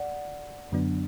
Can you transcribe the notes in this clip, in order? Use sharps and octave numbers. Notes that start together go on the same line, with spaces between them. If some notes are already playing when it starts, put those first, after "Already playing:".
Already playing: D5 F#5
F#2 D3 F#3 B3 D4